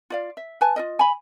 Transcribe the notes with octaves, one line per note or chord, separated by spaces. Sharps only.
F4 D5 F5
E5
B4 G#5 A5
F4 A#4 D#5
G#5 B5